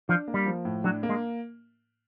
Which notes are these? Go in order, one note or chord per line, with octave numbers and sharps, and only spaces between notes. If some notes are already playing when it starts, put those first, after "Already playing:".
F3 D4
A#3
G3
F3
A2
F#3 D4
A#3
G#3